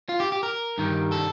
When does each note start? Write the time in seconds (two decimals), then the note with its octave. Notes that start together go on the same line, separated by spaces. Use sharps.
0.09 F4
0.20 G4
0.32 G4
0.43 A#4
0.78 G2 D#3 G3
1.12 A4